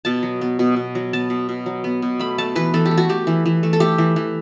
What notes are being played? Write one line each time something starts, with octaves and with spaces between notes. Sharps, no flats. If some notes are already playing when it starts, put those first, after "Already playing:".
B2 A5
F#3
B3
B2
B2
F#3
B3 A5
B2
B2
F#3
B3
B2
A3 B5
A3 A5
E3 B4
E3 A4
G4
A3
F#4
A3 G4
E3
E3
A3
A4
A3 G4
E3
E3